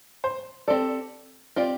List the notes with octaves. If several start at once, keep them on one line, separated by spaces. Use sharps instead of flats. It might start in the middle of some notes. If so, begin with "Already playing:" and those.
C5
C4 G4 A4 D5
C4 F4 G4 D5